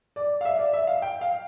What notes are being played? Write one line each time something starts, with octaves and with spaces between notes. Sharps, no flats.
D5
F5
E5
D5
E5
F5
G5
F5